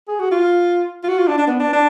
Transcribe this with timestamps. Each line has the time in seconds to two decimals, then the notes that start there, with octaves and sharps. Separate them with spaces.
0.08 G#4
0.19 F#4
0.31 F4
1.04 F4
1.08 F#4
1.18 F4
1.27 D4
1.38 D4
1.47 B3
1.60 D4
1.73 D4